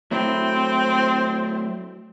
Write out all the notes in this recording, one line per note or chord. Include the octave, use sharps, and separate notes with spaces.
F#3 A3 C4 E4